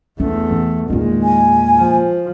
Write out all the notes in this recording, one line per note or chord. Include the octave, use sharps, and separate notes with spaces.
E2 A3 D4
E3
E2 A#2 D#3 G#3 D#4
G#5
F3